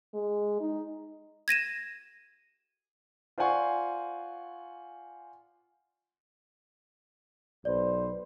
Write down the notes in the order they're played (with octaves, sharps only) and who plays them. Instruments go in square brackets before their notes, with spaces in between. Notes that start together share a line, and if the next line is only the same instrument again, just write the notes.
[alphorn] G#3
D#4
[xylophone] G#6 A#6 D#7 E7
[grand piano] F4 C5 D5 F#5 G#5 C#6
[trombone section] B1 B4 C5 [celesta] D5